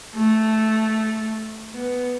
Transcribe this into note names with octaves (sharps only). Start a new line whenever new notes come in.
A3
B3